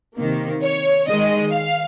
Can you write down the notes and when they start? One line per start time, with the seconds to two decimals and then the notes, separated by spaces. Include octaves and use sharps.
0.17 C3 D#3 A#3
0.63 C#5
1.07 D#3 G#3 D#5
1.53 F5